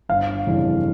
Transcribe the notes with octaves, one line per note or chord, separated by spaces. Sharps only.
G1 F5
F2 C#3 E3 G3